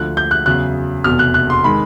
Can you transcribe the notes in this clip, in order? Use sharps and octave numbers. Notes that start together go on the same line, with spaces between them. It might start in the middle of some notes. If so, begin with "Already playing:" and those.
Already playing: D2 D3 F3 F#6
G6
F#6
E2 C#3 F#3 F#6
F1 E2 B2 F6
F#6
F#6
C6
D#3 G#3 B5